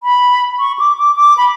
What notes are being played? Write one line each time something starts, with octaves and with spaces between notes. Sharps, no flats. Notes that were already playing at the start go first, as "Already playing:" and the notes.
B5
C#6
D6
D6
D6
B5